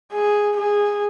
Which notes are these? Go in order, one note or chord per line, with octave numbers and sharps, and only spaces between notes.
G#4
G#4